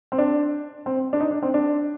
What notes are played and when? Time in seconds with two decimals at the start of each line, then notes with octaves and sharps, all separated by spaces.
0.12 C4
0.18 D4
0.86 C4
1.13 D4
1.20 D#4
1.31 D4
1.43 C4
1.54 D4